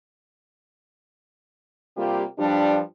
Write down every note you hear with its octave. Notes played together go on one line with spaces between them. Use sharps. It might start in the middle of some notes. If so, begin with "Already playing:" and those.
C3 G3 A#3 F4 G4
G2 F3 G3 D4